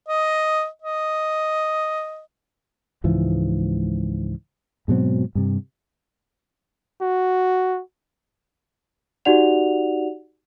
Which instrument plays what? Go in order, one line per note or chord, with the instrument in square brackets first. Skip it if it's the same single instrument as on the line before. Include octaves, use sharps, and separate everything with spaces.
[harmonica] D#5
D#5
[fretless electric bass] C#2 G#2 E3 F3
G#2 B2 F#3 C4
G2 C3
[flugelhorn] F#4
[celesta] D#4 F#4 G4 D5 F#5 F7